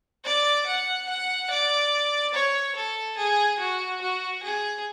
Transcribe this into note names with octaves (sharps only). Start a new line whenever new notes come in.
D5
F#5
F#5
D5
C#5
A4
G#4
F#4
F#4
G#4